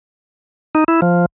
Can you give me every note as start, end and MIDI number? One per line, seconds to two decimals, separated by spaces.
0.75 0.84 63
0.88 1.01 64
1.02 1.26 53